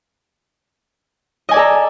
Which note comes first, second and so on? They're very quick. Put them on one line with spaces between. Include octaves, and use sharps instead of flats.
D#5 G#5 D5 A4 A#5